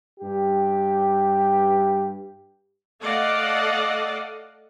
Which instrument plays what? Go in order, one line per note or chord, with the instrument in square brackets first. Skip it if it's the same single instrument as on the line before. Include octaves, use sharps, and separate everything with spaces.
[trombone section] G2 G4
[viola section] A3 A4 D5 D#5 F5 F#5